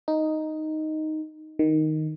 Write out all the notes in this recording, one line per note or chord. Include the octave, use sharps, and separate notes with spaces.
D#4
D#3